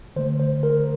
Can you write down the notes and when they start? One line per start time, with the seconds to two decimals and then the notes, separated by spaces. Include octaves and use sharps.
0.16 D3 A3 C5
0.40 C5
0.63 A#4